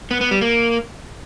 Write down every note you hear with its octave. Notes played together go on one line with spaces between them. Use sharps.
B3
B3
G3
A#3